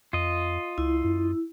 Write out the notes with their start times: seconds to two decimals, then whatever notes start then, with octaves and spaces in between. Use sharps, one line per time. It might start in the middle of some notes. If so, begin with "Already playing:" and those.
0.13 F2 F4 D#5
0.78 C#2 E4
1.04 F#2